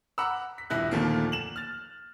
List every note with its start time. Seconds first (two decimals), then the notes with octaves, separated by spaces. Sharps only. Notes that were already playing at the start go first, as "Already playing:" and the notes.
0.18 F#5 A#5 B5 D6 E6
0.58 B6
0.70 D#1 G2 E4 F#6
0.91 D#2 A#2 D3 F3 A3 A#3
1.32 E7 F#7
1.56 F6 A6